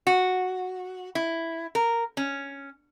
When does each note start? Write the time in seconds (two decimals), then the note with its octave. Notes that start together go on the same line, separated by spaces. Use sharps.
0.07 F#4
1.15 E4
1.75 A#4
2.17 C#4